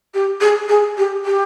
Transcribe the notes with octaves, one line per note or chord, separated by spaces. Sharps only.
G4
G#4
G#4
G4
G4